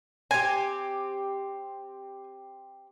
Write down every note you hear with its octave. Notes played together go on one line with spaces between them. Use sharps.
C4 G4 G#5